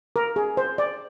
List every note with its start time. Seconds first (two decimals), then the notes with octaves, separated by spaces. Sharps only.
0.16 A#4
0.36 G#4
0.57 C5
0.78 D5